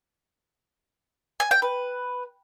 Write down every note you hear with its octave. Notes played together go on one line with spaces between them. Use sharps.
G#5
G5
B4